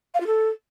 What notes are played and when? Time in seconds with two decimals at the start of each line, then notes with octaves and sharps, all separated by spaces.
0.14 F5
0.20 F4
0.27 A4